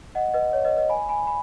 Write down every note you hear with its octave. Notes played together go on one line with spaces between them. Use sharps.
D#5 F#5
B4 D#5
C#5
B4 D#5
B4 D#5
G#5 B5
G#5 B5
B5